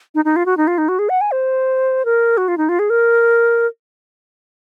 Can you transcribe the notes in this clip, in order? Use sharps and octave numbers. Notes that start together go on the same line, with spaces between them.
D#4
D#4
F4
F#4
D#4
F4
D#4
F#4
G#4
F#5
G#5
C5
A#4
F#4
F4
D#4
F4
G#4
A#4